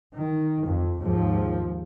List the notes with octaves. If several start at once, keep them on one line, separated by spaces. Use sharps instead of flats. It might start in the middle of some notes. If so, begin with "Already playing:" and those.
D#3
F2
D#2 G#2 F3